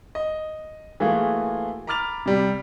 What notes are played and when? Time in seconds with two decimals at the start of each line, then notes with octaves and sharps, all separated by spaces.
0.15 D#5
1.00 E3 A3 A#3 F4 F#4 G#4
1.87 A#5 B5 D6 F6 A6 F7
2.26 C3 G3